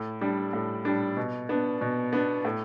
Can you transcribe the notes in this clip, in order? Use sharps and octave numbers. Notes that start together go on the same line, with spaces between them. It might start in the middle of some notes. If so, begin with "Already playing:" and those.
Already playing: A2
G3 D4
A2
G3 D4
B2
B3 D4
B2
B3 D4
A2